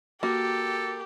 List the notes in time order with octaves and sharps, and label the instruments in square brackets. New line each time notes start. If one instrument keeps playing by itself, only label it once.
[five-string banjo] A#3 [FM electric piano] F#4 [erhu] G4 [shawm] A4